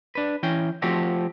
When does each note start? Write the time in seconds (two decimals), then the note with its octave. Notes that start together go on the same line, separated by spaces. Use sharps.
0.15 D4 B4
0.43 E3 C#4 G5
0.82 F3 A3 C4 F#4 G4